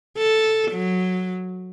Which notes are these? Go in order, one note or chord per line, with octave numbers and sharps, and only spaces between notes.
A4
F#3